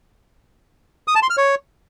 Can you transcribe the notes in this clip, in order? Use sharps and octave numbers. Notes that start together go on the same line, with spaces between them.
D#6
A5
C6
F6
C#5